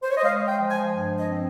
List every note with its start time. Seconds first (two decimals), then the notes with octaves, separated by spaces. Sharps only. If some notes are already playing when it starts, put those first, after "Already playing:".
0.03 C5
0.10 C#5
0.17 D#5
0.24 G#3 F5
0.48 G5
0.59 F3
0.71 G#5
0.94 G2
1.17 D#5
1.28 C4